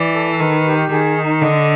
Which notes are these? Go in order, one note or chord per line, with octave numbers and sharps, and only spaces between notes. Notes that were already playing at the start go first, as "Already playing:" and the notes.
Already playing: E3 D5
A4
D#3 B4
G4
D#3 G#4
D#4
D3 D#5